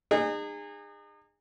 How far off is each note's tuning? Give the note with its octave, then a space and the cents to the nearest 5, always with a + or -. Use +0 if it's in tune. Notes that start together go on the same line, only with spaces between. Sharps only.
D#4 -35 G#4 -25